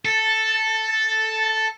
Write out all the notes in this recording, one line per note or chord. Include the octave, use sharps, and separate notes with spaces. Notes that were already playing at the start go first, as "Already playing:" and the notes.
A4 A6